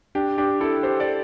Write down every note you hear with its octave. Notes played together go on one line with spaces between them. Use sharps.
D4 G4
D4 G4
E4 A4
G4 C5
A4 D5